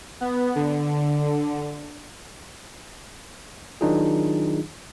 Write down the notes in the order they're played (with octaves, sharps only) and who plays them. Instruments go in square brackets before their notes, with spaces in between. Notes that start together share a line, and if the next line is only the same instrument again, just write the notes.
[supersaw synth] B3
D3
[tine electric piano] D#3 F#3 D4 D#4 F4 G#4